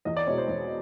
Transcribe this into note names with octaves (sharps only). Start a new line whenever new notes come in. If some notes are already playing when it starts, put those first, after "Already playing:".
E2 D#5
D5
B2 G#3 C#5
C5
E2 C#5